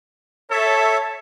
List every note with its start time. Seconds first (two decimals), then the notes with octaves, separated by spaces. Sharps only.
0.51 A4 C#5 E5